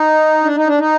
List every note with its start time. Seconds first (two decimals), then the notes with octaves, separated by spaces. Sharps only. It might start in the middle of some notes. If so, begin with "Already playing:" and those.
Already playing: D#4
0.44 D4
0.56 D#4
0.67 D4
0.78 D#4